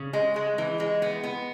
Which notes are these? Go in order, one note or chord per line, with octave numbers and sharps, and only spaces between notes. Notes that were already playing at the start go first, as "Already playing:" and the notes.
Already playing: C#3
G#3
G#3
E3
G#3
B3
B3